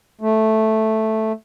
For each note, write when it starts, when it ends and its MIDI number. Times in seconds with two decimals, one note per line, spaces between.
0.21 1.32 57